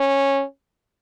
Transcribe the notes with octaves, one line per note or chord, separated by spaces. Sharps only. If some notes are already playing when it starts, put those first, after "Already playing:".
Already playing: C#4